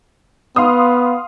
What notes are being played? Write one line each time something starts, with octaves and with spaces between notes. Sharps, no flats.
B3 F5 C6 D#6